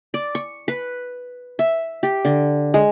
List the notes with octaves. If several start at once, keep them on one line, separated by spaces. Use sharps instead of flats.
D5
C#6
B4
E5
G4
D3
G#3